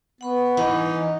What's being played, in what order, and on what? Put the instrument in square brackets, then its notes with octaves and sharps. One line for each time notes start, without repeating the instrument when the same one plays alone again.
[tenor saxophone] B3 [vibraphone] F#5 B5 C#6
[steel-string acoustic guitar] E3 C#4 [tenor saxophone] D#4